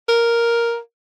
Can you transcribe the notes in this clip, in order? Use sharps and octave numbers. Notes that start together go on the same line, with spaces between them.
A#4